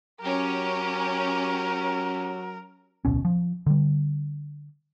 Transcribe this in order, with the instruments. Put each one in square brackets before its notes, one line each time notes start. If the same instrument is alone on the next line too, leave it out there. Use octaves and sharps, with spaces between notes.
[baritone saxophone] F#3 [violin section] C#4 G4 [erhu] A#4
[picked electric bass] D1 B1 B2 C#4
F3
D3 G3